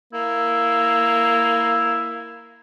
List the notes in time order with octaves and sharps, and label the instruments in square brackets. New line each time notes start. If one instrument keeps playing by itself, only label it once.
[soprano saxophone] A#3 [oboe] E4